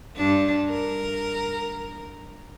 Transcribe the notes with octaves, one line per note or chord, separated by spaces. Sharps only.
G2 D4
A#4